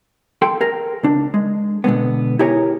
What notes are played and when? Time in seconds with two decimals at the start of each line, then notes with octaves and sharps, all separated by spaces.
0.42 A4 G5 C6
0.61 G#4 A#4
1.03 C#2 D4
1.34 G#3
1.84 B2 D3 G#3 B3
2.39 E4 G4 G#4 A#4 C#5 G#5